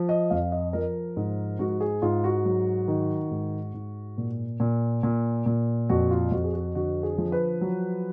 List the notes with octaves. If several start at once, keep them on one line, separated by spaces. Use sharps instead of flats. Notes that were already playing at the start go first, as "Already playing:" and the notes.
Already playing: F3
D#5
F2 F5
D#5
F3 A#4
G#2
G#2 F#4
G#4
G#2 F4
F#4
F#3
D#3
G#2
G#2
A#2
A#2
A#2
A#2
F2 F#4
F4
F2 F#4
G#4
F#4
D3 F#4
G#4
F3
B4
F#3